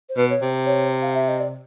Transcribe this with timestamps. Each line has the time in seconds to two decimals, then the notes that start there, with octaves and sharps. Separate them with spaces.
0.10 C5
0.17 B2 B4
0.30 C#5
0.42 C3 C5
0.66 C#5
1.02 F5
1.15 E5
1.28 D#5
1.40 D5